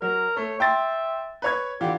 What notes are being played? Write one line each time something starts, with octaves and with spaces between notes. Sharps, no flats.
F#3 A#4
A3 C#5
E5 G5 C6 A6
B4 C#5 G#6
D3 E3 F4 G4